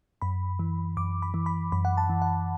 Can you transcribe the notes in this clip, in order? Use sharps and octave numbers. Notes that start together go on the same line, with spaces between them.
F#2 B5
E3
F#2 D6
B5
E3
B5
F#2 B5
F#5
A5
E3
F#5